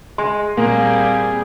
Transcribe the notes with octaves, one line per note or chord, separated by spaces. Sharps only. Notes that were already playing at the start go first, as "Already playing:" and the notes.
G#3 C6
A#2 G3 A#3 C4 G#4